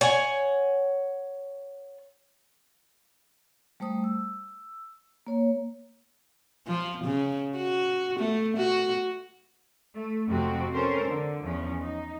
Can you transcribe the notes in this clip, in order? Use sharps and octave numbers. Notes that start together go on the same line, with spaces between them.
C#5 F#5 G#5
G3 A3 C5 D#6
E6
A#3 C#5
F3
C#3
F#4
A3
F#4
A3
F2 C3 F3 C4 F#4
C#4 A4 A#4 C5
D3
E2 F3 C#4
D#4